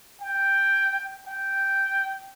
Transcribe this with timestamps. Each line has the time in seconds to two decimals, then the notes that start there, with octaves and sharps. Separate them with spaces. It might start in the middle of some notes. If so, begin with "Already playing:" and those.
0.22 G5
1.27 G5